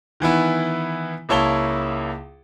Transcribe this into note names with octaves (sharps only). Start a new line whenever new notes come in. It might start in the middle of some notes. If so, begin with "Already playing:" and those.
D#3 E3 B3 E4
C#2 A#3 E4 C#5 A5 G7